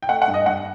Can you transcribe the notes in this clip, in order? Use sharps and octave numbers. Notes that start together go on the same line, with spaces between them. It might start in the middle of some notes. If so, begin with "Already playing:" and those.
G5
A3 F#5
F#5
G2
D#5
G2 F#5